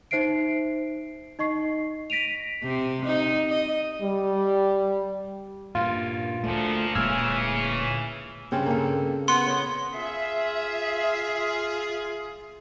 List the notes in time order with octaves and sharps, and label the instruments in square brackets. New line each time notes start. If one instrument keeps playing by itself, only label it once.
[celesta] D#4 C5 E5 C7 D7
D#4 D#5 C#6 C7
A#6 B6 D7 D#7 F7
[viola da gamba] C3
D#4
D#5
[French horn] G3
[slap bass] G2 A#2 [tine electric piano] F4
[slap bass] D2 A3 [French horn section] A#2 F3
[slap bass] D1 A#2 G#3 [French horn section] C#3 E3 [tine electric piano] E6 F6 G#6
[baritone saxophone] G2 [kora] C#3 C4 C#4
[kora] A#3 A4
[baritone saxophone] B3 [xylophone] C6
[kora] C#5 D#5
[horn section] F4 G#4 [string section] E5